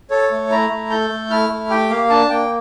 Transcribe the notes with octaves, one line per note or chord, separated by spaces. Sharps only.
A4 C#5
A3
E4 A#5
A3
A4 G6
A3
E4 F6
A3
G4 G5
A#3 F5
D4 A5
A#3 G5